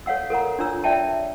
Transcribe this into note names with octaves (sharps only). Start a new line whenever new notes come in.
A4 C#5 F5 F#5 E6
A4 A#4 F#5 A#5
D4 F4 C#5 A#5 E6
C#5 D5 E5 G5 A5